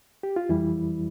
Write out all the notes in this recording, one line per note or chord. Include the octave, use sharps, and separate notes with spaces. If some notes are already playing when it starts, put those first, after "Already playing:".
G4
F4
F2 E3 G3 E4